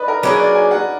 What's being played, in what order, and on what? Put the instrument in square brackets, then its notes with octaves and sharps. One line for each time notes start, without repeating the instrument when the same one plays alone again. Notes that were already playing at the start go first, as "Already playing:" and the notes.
Already playing: [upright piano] B4 D5 D#5
A#4
[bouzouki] F#3 A#3 D4 G#4 [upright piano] B4
[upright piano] D5
G#5
F#5